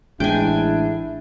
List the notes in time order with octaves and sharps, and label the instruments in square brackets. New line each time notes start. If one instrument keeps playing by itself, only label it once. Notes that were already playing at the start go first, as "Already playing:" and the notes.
[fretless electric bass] A1 G#3 [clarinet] D4 [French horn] E4 [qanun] G5 G#5